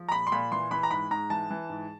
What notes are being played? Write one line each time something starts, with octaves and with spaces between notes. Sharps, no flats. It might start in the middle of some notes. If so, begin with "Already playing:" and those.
Already playing: F3
A#5
A#2 B5
C6
A#2 B5
E3 C6
E3 B5
A#5
G#2 B5
G#2 A#5
E3 A5
E3
G#2